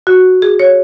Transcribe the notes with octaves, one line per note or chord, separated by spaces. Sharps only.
F#4
G#4
C#5